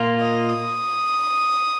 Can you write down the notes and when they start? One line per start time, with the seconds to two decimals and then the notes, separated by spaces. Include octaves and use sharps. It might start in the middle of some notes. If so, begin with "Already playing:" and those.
Already playing: A#2 A#3 F4
0.21 D#5
0.49 D#6